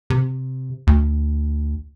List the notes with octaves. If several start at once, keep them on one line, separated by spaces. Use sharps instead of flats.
C3
D2